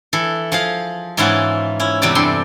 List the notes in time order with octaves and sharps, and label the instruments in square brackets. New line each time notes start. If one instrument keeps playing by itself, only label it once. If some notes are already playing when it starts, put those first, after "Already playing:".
[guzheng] E3 A4
F3 G#4 F5
G#2 E3 C#4 E4 F4 F#5
C#4 E4
E2 C3 G3 G4 B4 D5
G2 A4 G5 C6